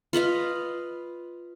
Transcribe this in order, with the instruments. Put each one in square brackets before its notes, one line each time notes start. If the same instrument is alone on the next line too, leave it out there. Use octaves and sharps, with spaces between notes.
[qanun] F4 B4 D#5 F5